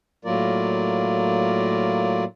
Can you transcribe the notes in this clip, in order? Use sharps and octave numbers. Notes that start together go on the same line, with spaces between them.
A2 F#3 A#3 F4 A#4 D5